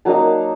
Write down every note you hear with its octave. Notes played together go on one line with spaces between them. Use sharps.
F#3 A#3 D#4 A5